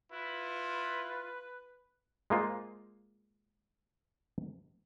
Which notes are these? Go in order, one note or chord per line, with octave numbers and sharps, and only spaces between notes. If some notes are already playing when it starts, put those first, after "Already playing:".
E4 F4 B4
G#3 A#3 F4 C5